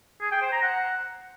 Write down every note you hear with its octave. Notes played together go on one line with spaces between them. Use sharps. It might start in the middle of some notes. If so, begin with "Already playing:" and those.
G#4
G5
C5
A#5
F#5